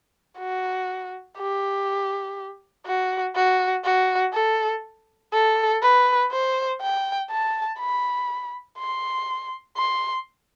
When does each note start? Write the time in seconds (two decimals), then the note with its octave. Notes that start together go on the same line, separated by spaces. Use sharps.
0.39 F#4
1.38 G4
2.86 F#4
3.35 F#4
3.84 F#4
4.33 A4
5.33 A4
5.82 B4
6.31 C5
6.81 G5
7.31 A5
7.79 B5
8.78 C6
9.77 C6